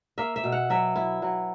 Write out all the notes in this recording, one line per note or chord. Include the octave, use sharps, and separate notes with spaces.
A#3 E5
E5
B2
F#5
F#3 E5
E4
F#3